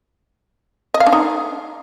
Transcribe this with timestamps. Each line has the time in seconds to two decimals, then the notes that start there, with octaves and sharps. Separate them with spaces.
0.94 D#5
1.00 F5
1.06 D4
1.13 D#4